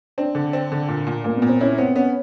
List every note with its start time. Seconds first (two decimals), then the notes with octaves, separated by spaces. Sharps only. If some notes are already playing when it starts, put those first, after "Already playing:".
0.18 C4 D4
0.35 D3
0.53 C4
0.72 D3
0.88 A#2
1.07 A#2
1.24 A#2 A#3
1.37 A#2 B3
1.49 C4
1.61 C#4 E4
1.78 B3 C4
1.96 B3 C#4